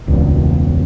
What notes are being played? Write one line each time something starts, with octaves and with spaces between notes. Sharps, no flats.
E1 C#2